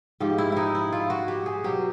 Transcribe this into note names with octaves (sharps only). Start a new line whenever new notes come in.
G#2 F3 G4
E4
D#4 E4
E4
F4
F#4
G4
G#4
B2 F#3 G4